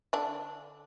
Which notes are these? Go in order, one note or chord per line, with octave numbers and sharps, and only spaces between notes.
D3 D4